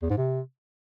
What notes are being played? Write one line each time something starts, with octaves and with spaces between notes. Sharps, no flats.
E2
G#2
C3